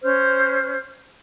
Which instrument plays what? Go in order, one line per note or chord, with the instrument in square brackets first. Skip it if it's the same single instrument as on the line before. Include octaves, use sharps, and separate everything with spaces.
[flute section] C#4 C5 F6